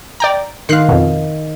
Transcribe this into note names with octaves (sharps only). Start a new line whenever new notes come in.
D5 G5 A#5
D#3 F5 C6 F#6 C7
F2 B2